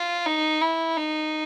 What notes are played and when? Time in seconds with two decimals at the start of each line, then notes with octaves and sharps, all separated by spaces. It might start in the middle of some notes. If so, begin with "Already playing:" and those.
Already playing: F4
0.26 D#4
0.62 E4
0.96 D#4